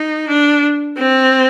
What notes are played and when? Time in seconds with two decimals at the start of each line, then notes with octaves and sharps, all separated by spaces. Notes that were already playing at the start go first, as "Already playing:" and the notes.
Already playing: D#4
0.28 D4
0.98 C4